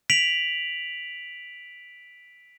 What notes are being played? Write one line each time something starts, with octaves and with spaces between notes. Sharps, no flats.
B6 D7 F7 F#7